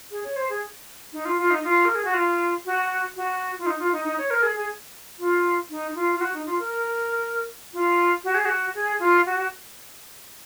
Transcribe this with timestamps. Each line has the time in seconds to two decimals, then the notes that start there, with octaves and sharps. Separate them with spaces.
0.11 G#4
0.24 C#5
0.36 C5
0.49 G#4
1.13 D#4
1.25 F4
1.38 F4
1.50 D#4
1.64 F4
1.85 A#4
1.95 G#4
2.05 F#4
2.14 F4
2.66 F#4
3.16 F#4
3.59 F4
3.66 D#4
3.79 F4
3.92 D#4
4.05 D#4
4.18 C#5
4.30 A#4
4.43 G#4
4.56 G#4
5.19 F4
5.70 D#4
5.95 F4
6.15 F4
6.21 F#4
6.34 D#4
6.46 F4
6.59 A#4
7.73 F4
8.24 F#4
8.34 G#4
8.45 F#4
8.75 G#4
8.99 F4
9.26 F#4
9.36 F#4